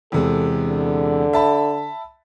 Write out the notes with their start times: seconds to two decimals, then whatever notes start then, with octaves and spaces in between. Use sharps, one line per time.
0.12 E2 C3 G#3 A4
0.66 D3
1.33 E5 A5 B5